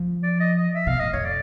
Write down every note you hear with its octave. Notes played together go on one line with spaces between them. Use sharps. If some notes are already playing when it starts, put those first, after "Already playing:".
Already playing: F3
D5
D#5
D#5
E5
B2 F5
A2 D#5
F2 C#5
D5